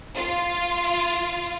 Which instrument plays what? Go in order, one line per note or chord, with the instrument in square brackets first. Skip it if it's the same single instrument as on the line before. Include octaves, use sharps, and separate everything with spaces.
[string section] F4